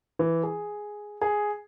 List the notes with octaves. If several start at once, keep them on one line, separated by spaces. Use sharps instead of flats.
E3
G#4
G#4